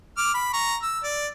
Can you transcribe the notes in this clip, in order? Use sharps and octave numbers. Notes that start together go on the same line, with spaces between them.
D6 F6
B5
A#5 C#6
E6
D5